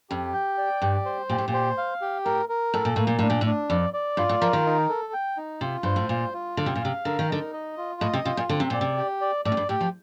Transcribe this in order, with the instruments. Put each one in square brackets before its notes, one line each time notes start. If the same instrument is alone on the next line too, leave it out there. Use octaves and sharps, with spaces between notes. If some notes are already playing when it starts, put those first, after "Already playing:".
[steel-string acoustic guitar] F2 [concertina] G4
[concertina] G5
D5
[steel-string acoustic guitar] G2 [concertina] G4
[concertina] C5
[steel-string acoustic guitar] A#2 [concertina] G4
[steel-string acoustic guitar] A2
A#2
[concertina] C5
F5
G4
[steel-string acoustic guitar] A2 [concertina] A#4
[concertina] A#4
[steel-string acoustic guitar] A2 [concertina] A4
[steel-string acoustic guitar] A#2
[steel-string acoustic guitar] A2 [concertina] A#3
[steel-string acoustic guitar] A#2
[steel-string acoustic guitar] A2 [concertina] D4
[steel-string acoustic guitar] A#2
A2
[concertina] D4
[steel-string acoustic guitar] F2 [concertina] D5
[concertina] D5
[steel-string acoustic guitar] G2 [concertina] F4
[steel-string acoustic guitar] A2
[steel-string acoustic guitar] F3 [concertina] A#4
[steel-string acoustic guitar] D#3
[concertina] D#4
A4
G5
D#4
[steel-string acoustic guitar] C3 [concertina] F4
[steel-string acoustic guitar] G2 [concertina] C5
[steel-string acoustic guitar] A2
[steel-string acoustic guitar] A#2 [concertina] F4
[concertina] F4
[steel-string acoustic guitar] D3 [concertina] F5
[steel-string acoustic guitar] C3
A#2
[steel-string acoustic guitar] C3 [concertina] F5
[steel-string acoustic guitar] D3 [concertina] A#4
[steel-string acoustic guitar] D#3
[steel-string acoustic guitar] D3 [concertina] D#4
[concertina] D#5
F4
[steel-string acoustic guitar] A2 [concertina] D#5
[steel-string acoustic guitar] C3
[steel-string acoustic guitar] C3 [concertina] F4
[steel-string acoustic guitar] A#2
[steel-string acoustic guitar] D3 [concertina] C4
[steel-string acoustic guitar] C3
[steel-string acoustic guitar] A#2 [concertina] D5
[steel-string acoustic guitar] C3
[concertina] G4
D5
[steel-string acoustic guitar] A2 [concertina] D5
[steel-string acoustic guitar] F2
G2
[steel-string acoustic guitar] A2 [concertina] G4
[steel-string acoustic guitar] F3